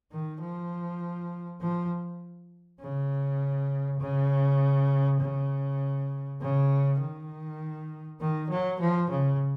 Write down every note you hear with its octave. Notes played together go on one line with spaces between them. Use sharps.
D#3
F3
F3
C#3
C#3
C#3
C#3
D#3
D#3
F#3
F3
C#3